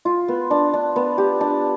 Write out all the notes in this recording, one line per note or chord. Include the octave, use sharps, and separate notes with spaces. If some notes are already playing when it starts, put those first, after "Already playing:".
F4
B3
D4
D4
B3
G4
D4